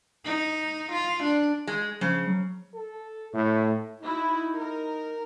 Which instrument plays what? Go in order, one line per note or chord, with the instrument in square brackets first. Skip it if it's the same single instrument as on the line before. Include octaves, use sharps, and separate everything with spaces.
[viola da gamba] D#4
F4
D4
[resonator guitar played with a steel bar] G#3
[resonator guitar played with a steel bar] C#3 [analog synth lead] F3
[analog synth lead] F#3
[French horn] A4
[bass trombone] A2 [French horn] A3
[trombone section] D#4 [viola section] E4 F#4
[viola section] A#4